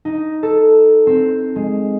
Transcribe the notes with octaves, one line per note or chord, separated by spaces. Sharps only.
D#4
A4
C4
G#3